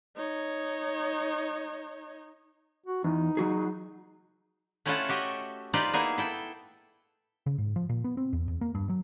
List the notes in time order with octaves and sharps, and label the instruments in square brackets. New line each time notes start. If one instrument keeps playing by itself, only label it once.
[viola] D#4 C#5
[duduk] F#4
[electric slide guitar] E2 [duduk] D#4
[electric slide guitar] F#3 F#4 G#4
[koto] A3 C#4 E4 F4 A4 F#5
F#4 G4 D#5 E5
D#4 F4 G4 B4 C5 D5
A#3 B3 D#4 E4 G#4
E4 A4 G5
[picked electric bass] C#3
G#2
F3
A#2
B3
C4
E2
E2
A#3
G2
F#3